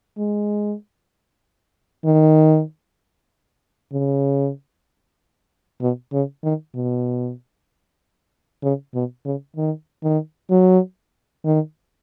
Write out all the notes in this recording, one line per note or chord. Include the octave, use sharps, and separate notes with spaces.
G#3
D#3
C#3
B2
C#3
D#3
B2
C#3
B2
C#3
D#3
D#3
F#3
D#3